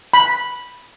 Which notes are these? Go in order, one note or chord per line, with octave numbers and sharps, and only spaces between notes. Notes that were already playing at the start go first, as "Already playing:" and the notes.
B5